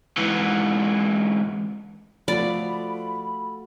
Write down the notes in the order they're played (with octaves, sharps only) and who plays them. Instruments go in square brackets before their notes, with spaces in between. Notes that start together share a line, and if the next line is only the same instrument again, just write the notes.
[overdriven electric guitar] G#2 E3
[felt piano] F3 [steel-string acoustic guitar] A3 F#4 F5 [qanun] D5 [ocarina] B5